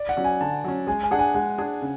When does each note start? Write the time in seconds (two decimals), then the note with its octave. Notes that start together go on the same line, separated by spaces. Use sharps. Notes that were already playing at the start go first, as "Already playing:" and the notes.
Already playing: D5
0.09 F#5
0.17 F#3 C#4
0.24 G#5
0.41 D3 A5
0.64 F#3 C#4
0.87 G#3 G#5
1.03 G#5
1.11 D4 G#4 F#5
1.19 G#5
1.34 G#3 F#5
1.58 D4 G#4
1.81 C#3